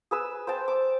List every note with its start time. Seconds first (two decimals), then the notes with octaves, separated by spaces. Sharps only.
0.11 G#4 B4 E6
0.47 C5 G5 A5
0.68 D6